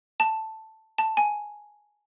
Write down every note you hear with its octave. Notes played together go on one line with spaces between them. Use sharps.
A5
A5
G#5